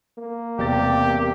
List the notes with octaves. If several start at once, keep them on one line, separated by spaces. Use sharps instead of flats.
A#3
E1 C3 G4 A6